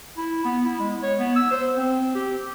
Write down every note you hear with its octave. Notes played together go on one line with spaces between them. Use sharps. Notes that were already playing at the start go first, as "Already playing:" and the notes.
E4
B3
E4
G#3
C#5
B3
E6
C5
C4
G4